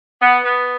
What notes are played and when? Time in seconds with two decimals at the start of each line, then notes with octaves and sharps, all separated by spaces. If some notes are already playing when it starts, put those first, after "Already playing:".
0.21 B3
0.44 B3